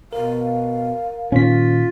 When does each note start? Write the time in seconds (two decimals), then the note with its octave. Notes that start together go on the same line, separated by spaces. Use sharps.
0.13 B2 A#4 F5
1.32 A#2 D#3 C#4 F4 B6